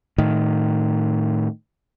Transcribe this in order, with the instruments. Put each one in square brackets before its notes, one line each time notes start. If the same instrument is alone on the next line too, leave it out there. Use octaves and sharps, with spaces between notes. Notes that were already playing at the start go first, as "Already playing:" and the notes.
[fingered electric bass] A2 D#3